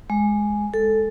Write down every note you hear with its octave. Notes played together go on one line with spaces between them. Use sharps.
G#3
A4